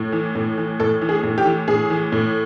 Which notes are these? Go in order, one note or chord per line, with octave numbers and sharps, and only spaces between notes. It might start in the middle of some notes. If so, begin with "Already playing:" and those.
Already playing: A2
E3
A2
E3
A2 A4
E3
G#4
A2
G4
E3
A2 G#4
E3
A2